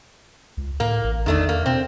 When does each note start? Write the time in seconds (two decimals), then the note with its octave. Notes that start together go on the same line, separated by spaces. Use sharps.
0.57 C#2
0.80 A2 A#3
1.04 A1
1.26 E2 D#3 A3 D4
1.49 A#3
1.66 B2 C4